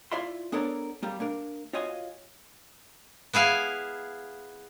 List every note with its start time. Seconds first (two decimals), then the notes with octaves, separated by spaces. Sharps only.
0.12 E4 F4 D5 E5 C6
0.52 B3 D4 A4 A#4 C#5 D5
1.03 G3 A#3
1.20 A#3 D4 A#4
1.73 F4 F#4 C#5 D#5 F5 G#5
3.33 B3 E4 G#4 F5